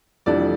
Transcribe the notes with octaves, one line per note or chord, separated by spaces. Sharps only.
F1 F2 E3 G3 D4 D5